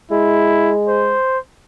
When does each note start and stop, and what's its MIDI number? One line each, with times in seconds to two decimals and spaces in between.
0.11 1.16 56
0.11 0.73 64
0.88 1.38 72